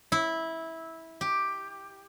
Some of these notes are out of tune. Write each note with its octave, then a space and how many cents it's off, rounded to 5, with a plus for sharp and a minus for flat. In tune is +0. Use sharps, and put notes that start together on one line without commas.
E4 -15
G4 +5